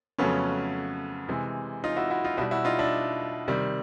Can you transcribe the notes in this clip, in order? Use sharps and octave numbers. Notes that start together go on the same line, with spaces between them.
F2 C#3 F#3 A3 B3 C#4
C3 E3 G#3
D#4 F4
E4 F#4
E4 F#4
D#4 F4
B2 G3 E4 F#4
E4 F#4
D#4 F4
D4 E4
C3 D#3 G3